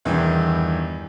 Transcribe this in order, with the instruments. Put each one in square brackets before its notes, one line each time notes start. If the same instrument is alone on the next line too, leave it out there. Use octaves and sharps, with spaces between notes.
[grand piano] E2 G2 D#3 E3